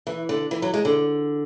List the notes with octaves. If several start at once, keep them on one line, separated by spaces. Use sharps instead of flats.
E3
D3
E3
F#3
G#3
D3